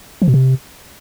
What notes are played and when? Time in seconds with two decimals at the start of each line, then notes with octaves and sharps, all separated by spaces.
0.22 F3
0.28 B2
0.34 C3